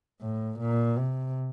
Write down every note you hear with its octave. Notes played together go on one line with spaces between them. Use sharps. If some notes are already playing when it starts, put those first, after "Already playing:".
A2
A#2
C3